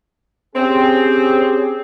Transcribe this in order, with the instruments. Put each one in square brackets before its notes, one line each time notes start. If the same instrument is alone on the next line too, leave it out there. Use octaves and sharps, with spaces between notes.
[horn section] C4 [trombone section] C#4 G4 G#4